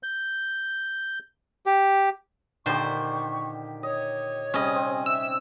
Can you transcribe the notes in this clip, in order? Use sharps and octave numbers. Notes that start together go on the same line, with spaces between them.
G6
G4
A#2 D3 D#3 G4 C5 C#6
C#5 D#5
C3 G3 C#4 G#4 D#5
C4
E5 E6